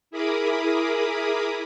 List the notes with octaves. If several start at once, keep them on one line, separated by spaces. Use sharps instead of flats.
E4 G#4 A#4 B5 D6 D#6